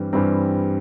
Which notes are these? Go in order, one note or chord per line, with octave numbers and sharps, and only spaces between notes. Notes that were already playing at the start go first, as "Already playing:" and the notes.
Already playing: G2 E3 G3 C4
G2 E3 G3 C4